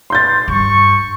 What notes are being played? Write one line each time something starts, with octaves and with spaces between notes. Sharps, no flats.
C6 G6 A6
G2 C#6